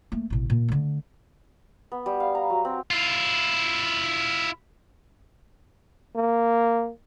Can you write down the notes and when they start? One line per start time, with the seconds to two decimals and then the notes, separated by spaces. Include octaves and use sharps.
0.12 A3 A#3
0.30 A1 B2
0.50 A#2
0.68 D3 A3
1.92 B3
2.06 G3
2.20 F5
2.35 A#5
2.50 F#3
2.65 C4
2.90 E4 F4
6.16 A#3